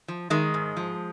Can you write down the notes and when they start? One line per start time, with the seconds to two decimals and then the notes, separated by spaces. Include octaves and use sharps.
0.08 F3
0.30 D#3 G#3
0.54 G#2
0.77 F3